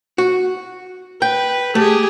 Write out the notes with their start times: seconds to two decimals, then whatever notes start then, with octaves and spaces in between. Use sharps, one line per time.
0.18 F#4
1.22 B4 G5
1.75 A3 G4 G#4